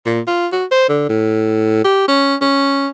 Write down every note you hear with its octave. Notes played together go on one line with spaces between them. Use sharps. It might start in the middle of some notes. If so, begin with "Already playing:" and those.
A#2
F4
F#4
C5
D3
A2
G4
C#4
C#4